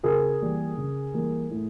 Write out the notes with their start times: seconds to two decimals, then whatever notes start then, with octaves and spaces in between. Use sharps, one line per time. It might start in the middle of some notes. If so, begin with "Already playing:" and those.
0.03 C#3 G#4 A#4
0.41 E3 G3 A#3
0.77 C#3
1.13 E3 G3 A#3
1.50 A2